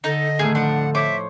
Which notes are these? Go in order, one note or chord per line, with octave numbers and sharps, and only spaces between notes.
D3 D#4 A4 D#5
A2 D#3 A3 G#4
F3 D4 F#5
C5 C#5 E5 D6